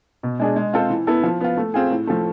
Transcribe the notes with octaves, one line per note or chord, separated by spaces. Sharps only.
B2
G#3 D4 G#4
G#3
C4 F4 A4 C5
E3
B3 E4 A4
F3
B3 F4
A3
C4 F4 G#4
A2
F3 A3